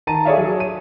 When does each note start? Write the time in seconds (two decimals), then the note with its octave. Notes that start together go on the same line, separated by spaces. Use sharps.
0.07 D#3 A5 A#5 D#7
0.25 G#4 A4 C#5 D5 E5 F5
0.38 F#3
0.60 D#7